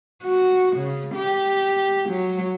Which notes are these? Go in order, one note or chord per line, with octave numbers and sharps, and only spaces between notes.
F#4
C#3
G4
F#3